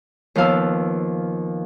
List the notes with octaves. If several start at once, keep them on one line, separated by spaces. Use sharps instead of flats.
D#2 F3 B3 F5 A5 E6